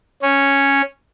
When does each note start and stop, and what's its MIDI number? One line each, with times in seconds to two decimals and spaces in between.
0.22 0.82 61